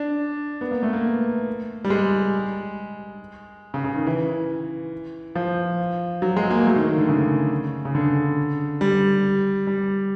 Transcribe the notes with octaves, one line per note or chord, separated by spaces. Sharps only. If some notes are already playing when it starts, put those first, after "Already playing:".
Already playing: D4
B3
A#3
A3
A#3
G3
G#3
C#3
C#3
D#3
E3
F3
F#3
G#3
A#3
A3
D#3
D#3
D3
C#3
C#3
D3
G3
G3